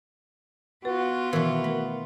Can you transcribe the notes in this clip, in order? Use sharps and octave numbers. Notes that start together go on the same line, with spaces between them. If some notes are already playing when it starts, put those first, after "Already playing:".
B3 F4 F#4 B4
B2 D#3 E3 F#4 A#4 G#6
A3 A#4 B5